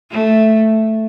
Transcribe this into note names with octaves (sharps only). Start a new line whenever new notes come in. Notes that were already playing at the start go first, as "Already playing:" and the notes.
A3